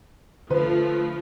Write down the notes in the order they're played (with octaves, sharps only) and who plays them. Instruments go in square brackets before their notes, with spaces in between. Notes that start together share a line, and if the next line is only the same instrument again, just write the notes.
[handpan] D3 [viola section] F3 A3 [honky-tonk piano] B4